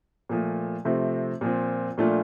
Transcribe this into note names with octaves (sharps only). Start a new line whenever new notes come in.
A#2 F3 A3
C3 F3 A3 C4
A#2 F3 C4
A#2 F3 A3 D4 F4